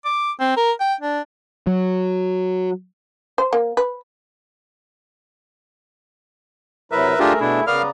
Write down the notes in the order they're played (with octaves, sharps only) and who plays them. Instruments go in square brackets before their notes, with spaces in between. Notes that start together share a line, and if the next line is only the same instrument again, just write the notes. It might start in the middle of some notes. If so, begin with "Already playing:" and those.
[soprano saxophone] D6
C4
A#4
G5
D4
[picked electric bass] F#3
[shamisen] C5
A#3
B4
[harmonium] C3 F#3 E4 [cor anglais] A#4 [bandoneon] B4 E5
[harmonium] A3 G#4 E5 [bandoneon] D4 F4 G4
[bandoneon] B2 D4 [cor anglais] E4
[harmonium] C#3 D5 A#5 [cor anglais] B3 [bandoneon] A#4 F5 F6